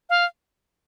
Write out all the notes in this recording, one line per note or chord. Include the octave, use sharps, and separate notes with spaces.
F5